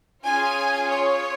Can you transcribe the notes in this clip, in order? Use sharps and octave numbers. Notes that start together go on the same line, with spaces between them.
C#4 F4 G#4 G#5
C#5